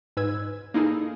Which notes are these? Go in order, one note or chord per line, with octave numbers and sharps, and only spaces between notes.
G#2 B4 E6 G#6
A#3 D#4 E4 G#4 A4